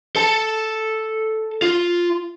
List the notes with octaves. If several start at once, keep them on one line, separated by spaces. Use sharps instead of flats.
A4 A5
F4